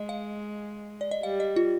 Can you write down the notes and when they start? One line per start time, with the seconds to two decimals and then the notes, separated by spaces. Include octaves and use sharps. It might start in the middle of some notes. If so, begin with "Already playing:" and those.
Already playing: G#3 D#5
0.09 F5
1.01 D5
1.11 D#5
1.23 G3 F5
1.40 D#5
1.56 F4